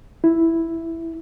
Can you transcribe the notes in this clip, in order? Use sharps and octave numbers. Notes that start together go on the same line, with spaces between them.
E4